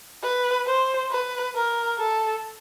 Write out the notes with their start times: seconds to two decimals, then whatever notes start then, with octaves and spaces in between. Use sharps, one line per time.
0.23 B4
0.66 C5
1.11 B4
1.55 A#4
1.98 A4